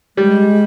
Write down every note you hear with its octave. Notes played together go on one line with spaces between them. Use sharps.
G3 G#3